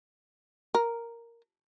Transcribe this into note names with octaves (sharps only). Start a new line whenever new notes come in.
A#4